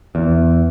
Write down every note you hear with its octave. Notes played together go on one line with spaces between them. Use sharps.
E2